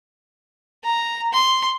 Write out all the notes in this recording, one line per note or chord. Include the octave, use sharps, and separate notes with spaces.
A#5
C6